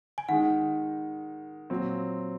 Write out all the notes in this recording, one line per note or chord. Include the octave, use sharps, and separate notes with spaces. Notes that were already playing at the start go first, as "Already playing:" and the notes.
G#5
D#3 G#3 D#4 F#5
A#2 F#3 C4